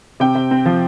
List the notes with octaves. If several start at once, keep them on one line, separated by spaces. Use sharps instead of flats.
C3 G5
C3
C4
F3